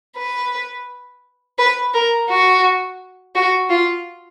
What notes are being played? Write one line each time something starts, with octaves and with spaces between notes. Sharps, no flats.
B4
B4
A#4
F#4
F#4
F4